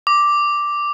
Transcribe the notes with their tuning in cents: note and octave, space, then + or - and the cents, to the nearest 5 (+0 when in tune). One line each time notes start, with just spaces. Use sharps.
D6 +0